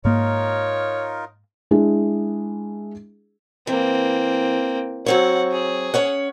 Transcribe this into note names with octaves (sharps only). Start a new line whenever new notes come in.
G#2 A#3 D#4 F4 A#4 C#5
G#3 D4 E4 G#4
E3 A#3 C4
F#3 C4 C#5 F#5
G#4
C#4 C#5 F#5